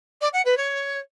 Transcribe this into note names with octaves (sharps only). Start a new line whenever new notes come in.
D5
F#5
B4
C#5